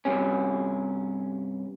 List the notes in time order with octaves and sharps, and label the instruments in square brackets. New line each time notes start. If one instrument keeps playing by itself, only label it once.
[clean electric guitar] G2 C3 C#4